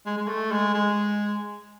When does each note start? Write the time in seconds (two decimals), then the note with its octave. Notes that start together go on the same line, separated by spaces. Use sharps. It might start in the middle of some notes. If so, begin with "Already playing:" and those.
0.06 G#3
0.18 G#3
0.28 A3
0.52 G#3
0.75 G#3